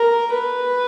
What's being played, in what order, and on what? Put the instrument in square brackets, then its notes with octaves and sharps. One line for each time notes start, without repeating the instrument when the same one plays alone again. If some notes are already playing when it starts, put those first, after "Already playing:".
Already playing: [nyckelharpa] A#4
B4